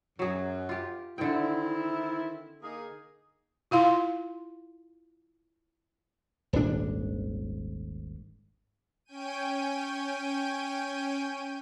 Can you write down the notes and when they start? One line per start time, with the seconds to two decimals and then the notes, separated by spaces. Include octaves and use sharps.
0.19 F#2 F#3 G#4
0.69 F4 G4
1.18 D3 D#3 C4 E4 G5
2.63 A#3 D#4 G#4
3.71 E4 F4 F5 C6
6.53 D#1 G#1 D4
9.05 C#4 G5 G#5 G6 D#7